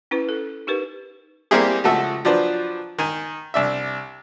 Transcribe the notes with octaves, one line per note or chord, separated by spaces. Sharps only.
C#4 E4 B4
A4
D#4 G4 A#4 B4
G3 A#3 C4 E4 G4 G#4
C#2 F3 A3 F#4 A4 E5
F3 F#3 D4 B4 C5
D#3 G#5
C2 D4 E5